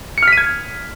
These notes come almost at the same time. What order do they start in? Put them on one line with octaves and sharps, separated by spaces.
C#7 F6 B6 D#7 G#6